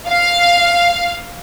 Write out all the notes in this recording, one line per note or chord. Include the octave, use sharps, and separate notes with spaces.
F5